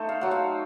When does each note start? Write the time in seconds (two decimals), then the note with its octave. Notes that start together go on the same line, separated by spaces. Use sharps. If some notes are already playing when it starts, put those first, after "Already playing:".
Already playing: A3 D#4 A4 C5
0.09 F5
0.21 F#3 F#5
0.31 F5